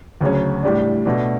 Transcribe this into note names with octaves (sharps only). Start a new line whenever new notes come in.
D2 C#3 F#3 C#4
A2 G3 D4
B2 A3 D4